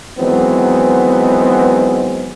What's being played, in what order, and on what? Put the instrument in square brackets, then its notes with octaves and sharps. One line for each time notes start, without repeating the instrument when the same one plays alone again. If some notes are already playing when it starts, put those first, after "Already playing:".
[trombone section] D#3 E3 F#3 G#3 B3 C4